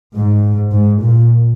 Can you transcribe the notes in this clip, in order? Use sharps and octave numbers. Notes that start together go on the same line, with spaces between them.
G#2
G#2
A#2